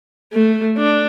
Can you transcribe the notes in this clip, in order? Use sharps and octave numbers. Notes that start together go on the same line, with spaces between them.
A3
D4